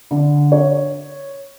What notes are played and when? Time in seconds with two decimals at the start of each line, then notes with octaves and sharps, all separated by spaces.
0.11 D3
0.52 C#5